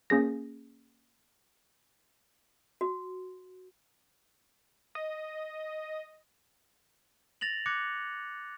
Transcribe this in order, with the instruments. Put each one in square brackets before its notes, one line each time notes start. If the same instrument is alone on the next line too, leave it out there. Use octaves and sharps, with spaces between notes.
[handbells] A#3 C#4 G#4 A#6
[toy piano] F#4
[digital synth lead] D#5
[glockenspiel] A6 A#6 F7 F#7
D6 F#6 G#6 A#6 C#7